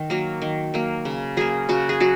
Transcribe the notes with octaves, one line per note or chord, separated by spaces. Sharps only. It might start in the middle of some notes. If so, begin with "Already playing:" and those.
Already playing: D#3
F#3 A#3
D#3
F#3 A#3
C#3
F#3 A#3 G#4
C#3 F#4
G#4
F#3 F#4